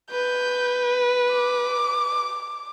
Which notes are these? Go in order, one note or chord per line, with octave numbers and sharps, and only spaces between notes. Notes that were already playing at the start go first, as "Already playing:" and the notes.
B4 G6
D6